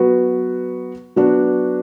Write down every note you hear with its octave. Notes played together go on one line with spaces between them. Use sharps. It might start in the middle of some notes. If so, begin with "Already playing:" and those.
Already playing: F#3 B3 F#4 B4
F#3 B3 D4 F#4